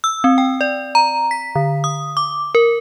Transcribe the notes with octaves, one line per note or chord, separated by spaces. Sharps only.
E6
C4
G5
D5
A#5
B6
D3
D#6
D6
A#4